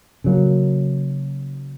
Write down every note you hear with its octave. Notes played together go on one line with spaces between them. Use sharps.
C#3 F#3 A#3